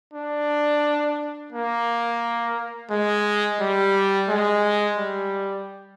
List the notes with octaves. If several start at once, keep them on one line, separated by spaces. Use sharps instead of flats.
D4
A#3
G#3
G3
G#3
G3